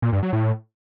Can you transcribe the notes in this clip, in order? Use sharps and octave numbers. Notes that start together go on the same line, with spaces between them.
A#2
G2
F#3
A2